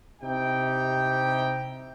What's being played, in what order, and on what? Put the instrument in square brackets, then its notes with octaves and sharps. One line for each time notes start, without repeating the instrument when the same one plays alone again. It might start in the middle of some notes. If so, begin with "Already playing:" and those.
[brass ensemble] C3 D#4 E4 G4 G5